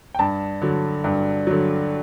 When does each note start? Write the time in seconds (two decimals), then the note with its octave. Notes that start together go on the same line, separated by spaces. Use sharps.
0.15 G5
0.19 G2 A5
0.62 D3 F#3
1.04 G2
1.47 D3 F#3